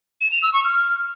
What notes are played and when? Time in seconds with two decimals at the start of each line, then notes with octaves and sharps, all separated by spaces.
0.21 E7
0.32 F7
0.43 E6
0.54 C#6
0.64 F6